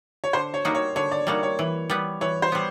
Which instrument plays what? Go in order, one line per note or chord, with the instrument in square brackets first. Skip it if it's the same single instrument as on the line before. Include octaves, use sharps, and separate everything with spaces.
[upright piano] C#5
[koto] D3 [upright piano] C5
[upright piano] C#5
[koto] G3 A#3 D#4 F#4
[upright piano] C#5
[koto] D3 [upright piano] C#5
[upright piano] D5
[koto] G3 A#3 D#4 F#4 [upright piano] D5
[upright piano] C#5
[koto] E3
G3 B3
[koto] E3 [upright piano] C#5
[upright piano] C5
[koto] G3 B3